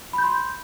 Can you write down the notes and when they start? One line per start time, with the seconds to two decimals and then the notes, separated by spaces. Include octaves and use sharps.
0.13 B5
0.18 G6
0.23 C6